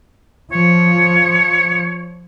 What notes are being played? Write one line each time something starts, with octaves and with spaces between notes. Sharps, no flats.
F3 C#5